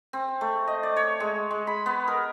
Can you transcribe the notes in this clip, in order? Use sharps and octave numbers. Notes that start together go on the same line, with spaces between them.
C4
A3
D#5
D5
C#5
G#3
G#3
B5
B3
A#4